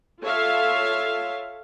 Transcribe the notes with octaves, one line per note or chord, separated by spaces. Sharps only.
F4 A4 C#5 E5 F5